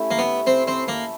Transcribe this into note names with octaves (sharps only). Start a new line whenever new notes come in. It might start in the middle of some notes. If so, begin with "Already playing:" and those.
Already playing: A3 C#4 E4 G4
A#3
B3
C4
C4
A#3